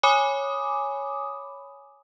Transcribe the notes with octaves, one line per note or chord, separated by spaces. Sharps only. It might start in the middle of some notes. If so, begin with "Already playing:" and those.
C#5 G#5 B5 D6 D#6